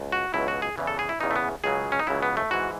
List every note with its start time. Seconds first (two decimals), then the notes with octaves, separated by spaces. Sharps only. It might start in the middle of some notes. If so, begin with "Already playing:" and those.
Already playing: C#2
0.12 F#4
0.34 C#2 B2 F#3 E4
0.48 F#4
0.62 G#4
0.78 E2 C#3 E3
0.87 A4
0.99 G#4
1.09 E4
1.20 E2 C#3 E3 D#4
1.31 A3
1.36 B3
1.64 C#2 C#3 F#3 G#4
1.92 C#4
1.99 D#4
2.07 C#2 C#3 F#3 E4
2.23 B3
2.37 A3
2.51 G#2 E3 F#4